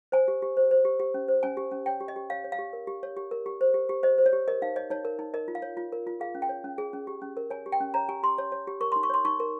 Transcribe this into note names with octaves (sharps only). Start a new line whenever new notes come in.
C5 G#5
G4
G4
C5
C5
G4
G4
C#4
C5
C#4 G#5
G4
C#4
C#5 G5
G4
D#5
G4
C#5 F5
C#5
F5
G4
A#4
G4
C#5
G4
A#4
G4
C5
G4
G4
C5 D#5
C5
C#5
G4
A#4 D#5
D#4 F5
C#5 D#5
D#4 C#5
A#4
D#4
A#4 D#5
F4
F5
C#5
F4
A#4
F4
G#4 F5
C#4
G5
C#5
C#4
G#4
C#4
G4
C#4
A#4
C#5 G#5
G4
G5
C#4
C#5 A#5
G4 G#5
G4 C6
C#5
C#5
G4
A#4 C#6
C6
D#4
C#6
C#5 C6
D#4 C#6
A#4